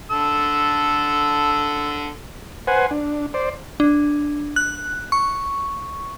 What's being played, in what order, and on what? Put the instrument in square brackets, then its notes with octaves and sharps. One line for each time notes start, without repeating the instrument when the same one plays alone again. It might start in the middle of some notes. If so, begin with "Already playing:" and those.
[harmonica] D3 A4 E6
[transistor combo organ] B4 C5 F#5 G#5
D4
C5 D5
[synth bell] D4
F#6
C#6